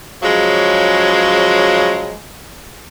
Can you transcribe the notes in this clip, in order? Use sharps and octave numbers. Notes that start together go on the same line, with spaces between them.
C#3 F3 F#3 G#3